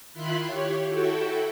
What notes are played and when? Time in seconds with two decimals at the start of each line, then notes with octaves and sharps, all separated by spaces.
0.14 D#3 E4 F4 B5 C6 F#6
0.46 G4 C#5
0.89 E4 F#4 A4 G5